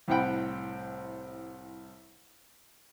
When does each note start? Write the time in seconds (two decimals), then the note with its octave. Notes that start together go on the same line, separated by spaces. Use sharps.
0.08 C2 A2 C4 F#5 G5 B5